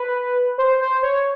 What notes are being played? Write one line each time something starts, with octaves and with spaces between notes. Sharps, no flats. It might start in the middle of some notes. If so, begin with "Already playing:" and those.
Already playing: B4
C5
C5
C#5